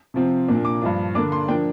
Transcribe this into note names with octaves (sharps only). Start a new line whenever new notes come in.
C3 F3 C4
A#2 A#3 D4
D6
G2 F3 D4
D3 A#3 D4 D6
C6
F3 A#3 D4 G5